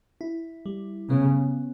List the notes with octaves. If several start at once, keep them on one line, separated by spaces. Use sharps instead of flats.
E4
G3
C#3 B3